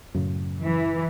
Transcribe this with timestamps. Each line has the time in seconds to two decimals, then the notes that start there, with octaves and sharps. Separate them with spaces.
0.15 F#2 A2 C#3
0.63 E3